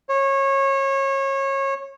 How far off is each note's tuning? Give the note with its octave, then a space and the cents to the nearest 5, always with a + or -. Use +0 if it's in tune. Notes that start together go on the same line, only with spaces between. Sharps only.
C#5 -25